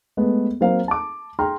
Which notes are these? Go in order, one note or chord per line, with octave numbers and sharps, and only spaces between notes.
G#3 A3 B3
F#3 A#3 C4 C5 F5
A5 D6
G#4 G5 A#5 C6 F6